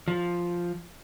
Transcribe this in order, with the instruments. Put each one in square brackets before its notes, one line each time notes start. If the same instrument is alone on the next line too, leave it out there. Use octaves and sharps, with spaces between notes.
[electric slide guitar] F3